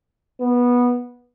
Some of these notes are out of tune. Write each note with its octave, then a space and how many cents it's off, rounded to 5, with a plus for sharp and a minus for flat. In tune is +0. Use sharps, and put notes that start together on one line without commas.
B3 -15